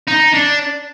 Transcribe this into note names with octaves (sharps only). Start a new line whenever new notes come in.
D#4
D4